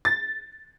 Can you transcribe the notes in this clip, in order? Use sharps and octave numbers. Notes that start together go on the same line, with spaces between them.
A6